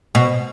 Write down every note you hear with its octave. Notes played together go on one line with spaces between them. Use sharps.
B2